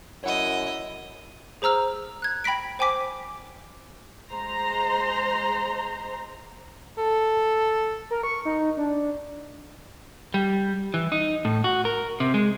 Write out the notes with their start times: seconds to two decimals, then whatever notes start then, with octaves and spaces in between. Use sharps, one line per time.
0.24 F#2 E4 C#5 D#5 F#5
1.62 G#4 C5 A#5 E6 F6
2.22 F#6 G#6
2.44 G5 B5 A#6 B6 D7
2.79 C5 G5 G#5 D6 B6
4.32 G#3 C5 A#5 C6
6.98 A4
8.11 A#4
8.23 C#6
8.45 D#4
8.77 D4
10.34 G3
10.94 E3
11.12 D#4
11.45 A2
11.64 F#4
11.85 A#4
12.20 C3
12.34 G#3